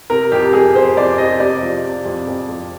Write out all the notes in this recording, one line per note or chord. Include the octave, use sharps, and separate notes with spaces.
C3 A#4
F2 G4
F2 G#4
F2 C5
F2 D5
C3 D#5
C3 D5
F3
C3
F2
F2
F2